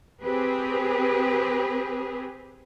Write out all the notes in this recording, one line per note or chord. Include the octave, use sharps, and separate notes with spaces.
C4 G4 G#4 B4